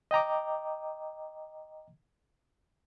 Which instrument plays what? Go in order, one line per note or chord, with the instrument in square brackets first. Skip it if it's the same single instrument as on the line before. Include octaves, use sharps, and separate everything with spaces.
[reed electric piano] D#5 G5 A#5 D6